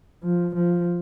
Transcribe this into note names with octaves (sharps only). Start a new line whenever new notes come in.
F3
F3